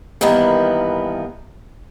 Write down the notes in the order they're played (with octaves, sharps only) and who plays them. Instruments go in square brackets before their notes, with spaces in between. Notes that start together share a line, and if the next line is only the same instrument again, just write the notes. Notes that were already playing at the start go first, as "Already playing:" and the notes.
[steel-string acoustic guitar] G2 D#3 E3 A#3 B3